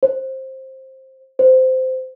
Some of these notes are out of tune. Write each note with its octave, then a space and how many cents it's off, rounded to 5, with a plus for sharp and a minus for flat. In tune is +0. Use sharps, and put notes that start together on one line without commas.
C5 +15
C5 -15